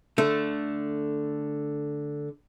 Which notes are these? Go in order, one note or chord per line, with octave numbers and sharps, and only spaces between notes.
D3 A3